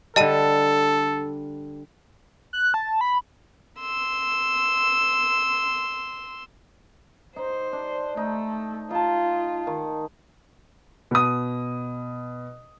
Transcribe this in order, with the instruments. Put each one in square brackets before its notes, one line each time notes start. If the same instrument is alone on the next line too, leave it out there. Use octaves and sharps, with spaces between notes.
[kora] D3 G3 [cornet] A4 [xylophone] D#5 A5 D#7
[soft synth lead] F#6
A5
B5
[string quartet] C6 E6
[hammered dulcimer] D#4 [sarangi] C5
[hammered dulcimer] D4
[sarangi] A3 [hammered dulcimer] D#4
[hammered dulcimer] D#4 A5 [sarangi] F4
[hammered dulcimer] D#3
[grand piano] B2 D#6